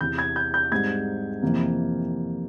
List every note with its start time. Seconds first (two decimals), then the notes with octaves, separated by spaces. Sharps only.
0.01 E2 C3 E3 G6
0.18 G#6
0.36 G6
0.54 G6
0.71 G#2 G3 C4 G#6
1.42 F2 C3 E3 A#3